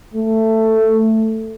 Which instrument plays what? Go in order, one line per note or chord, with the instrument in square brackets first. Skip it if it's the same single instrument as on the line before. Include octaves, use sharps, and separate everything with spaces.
[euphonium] A3